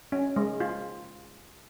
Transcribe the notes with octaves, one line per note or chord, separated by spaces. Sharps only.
C#4
G#3
F4